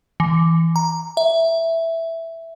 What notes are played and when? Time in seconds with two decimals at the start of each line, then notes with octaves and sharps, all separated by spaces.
0.20 E3
0.76 A#5
1.17 E5